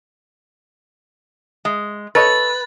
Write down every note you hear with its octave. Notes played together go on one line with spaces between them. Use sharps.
G#3
A4 B4 C#5 D#5 A6